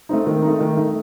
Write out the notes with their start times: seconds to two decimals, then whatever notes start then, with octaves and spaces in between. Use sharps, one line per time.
0.09 A3 C4 D#4
0.26 D#3
0.42 D#4
0.48 A3
0.60 D#3
0.77 A3 D#4